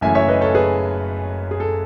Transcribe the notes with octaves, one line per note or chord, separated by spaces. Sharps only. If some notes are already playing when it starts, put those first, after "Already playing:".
F#1 F#2 E3 A3 E5 G#5
C#5 E5
B4 D#5
A4 C#5
G#4 B4
G#4
A4